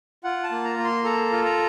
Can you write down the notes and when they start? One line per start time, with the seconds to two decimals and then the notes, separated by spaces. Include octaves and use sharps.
0.24 F4 F#5
0.44 A5
0.51 A#3
0.64 A#5
0.78 A#3
0.85 C6
1.05 A4 A#5
1.31 F4
1.45 A#5